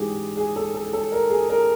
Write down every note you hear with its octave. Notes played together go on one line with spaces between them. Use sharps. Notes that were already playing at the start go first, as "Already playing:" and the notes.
Already playing: G#2 E3 G#3 C#4 G4 G#4
G#4
A4
A4
A4
A#4
G#4
A#4